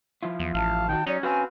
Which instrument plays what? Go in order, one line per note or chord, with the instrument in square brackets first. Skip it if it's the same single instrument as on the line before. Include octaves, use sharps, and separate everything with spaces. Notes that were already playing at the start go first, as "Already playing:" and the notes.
[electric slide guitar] F3 E4 F4
[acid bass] E2
[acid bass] A1 [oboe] F5 [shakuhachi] A5
[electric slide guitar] D#3 D#4 F#4 [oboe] G5
[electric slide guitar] F#3 [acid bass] C#4 [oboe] D#4 [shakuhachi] D5
[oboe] C4 [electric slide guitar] F#4 B4 F5 [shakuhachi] G#5